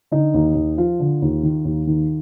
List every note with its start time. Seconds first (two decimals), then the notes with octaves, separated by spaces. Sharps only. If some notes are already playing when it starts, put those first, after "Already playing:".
0.12 D3 D#4
0.34 D#2
0.55 D#2
0.77 F3 F4
1.00 D3
1.22 D#2
1.43 D#3
1.65 D#2
1.87 D#3